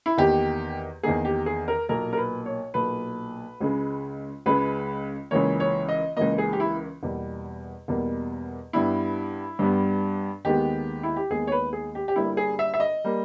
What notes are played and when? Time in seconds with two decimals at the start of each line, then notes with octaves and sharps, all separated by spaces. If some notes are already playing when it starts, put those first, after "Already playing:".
0.06 E4
0.18 E2 D#3 A#3 G4
1.03 E2 D#3 A#3 G#4
1.25 G4
1.46 G#4
1.68 A#4
1.89 B1 A#2 A#3 A#4
2.13 A#4
2.17 B4
2.46 C#5
2.74 B1 A#2 A#3 B4
3.61 C#2 C#3 G#3
4.46 C#2 C#3 G#3 B4
5.31 C#2 C#3 E3 A#3 C#5
5.60 C#5
5.89 D#5
6.16 C#2 C#3 E3 A#3 D#5
6.38 G#4
6.53 G4
6.60 E4
7.03 E2 B2 G3 A#3
7.88 E2 B2 G3 A#3
8.73 G2 G3 B3 E4
9.59 G2 G3 B3
10.45 D#2 D#3 G#3 B3 G4
11.03 E4
11.16 G4
11.30 D#2 D#3 G#3 B3 G#4
11.47 C#5
11.52 B4
11.73 G#4
11.95 G4
12.08 G4
12.16 G1 G2 G3 A#3 E4
12.37 G#4
12.59 E5
12.74 E5
12.80 D#5
13.05 G3 A#3